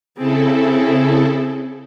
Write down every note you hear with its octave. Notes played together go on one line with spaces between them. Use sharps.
C#3 C4 E4 G#4 A4